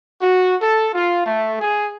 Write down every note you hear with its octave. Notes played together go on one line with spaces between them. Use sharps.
F#4
A4
F4
A3
G#4